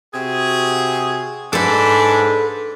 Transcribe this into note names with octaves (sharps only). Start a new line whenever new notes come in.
C3 F#4 G#4
G#2 D4 A4 B4